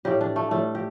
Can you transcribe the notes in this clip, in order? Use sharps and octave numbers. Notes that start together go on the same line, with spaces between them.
A2 G3 G4
D4
A3
A2 G3 A3
G4